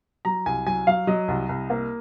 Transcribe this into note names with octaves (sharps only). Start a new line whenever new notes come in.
F#3 A#5
C2 G#5
F#3 G#5
F#3 F5
F#3 D#5
C2
C2
A#3